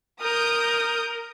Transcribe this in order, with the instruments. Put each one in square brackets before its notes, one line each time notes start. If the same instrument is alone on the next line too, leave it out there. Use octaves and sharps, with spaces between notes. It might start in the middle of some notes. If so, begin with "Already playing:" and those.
[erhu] A#4 [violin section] D#6 G6